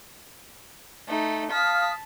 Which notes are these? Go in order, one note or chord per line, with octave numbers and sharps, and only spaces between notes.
A3 D#4
F5 A5 D#6 F6 B6